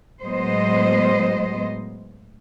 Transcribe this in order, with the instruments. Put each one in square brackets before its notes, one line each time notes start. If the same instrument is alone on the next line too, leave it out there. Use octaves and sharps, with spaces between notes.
[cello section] A2 F#3 G#3 B3 C5 D#5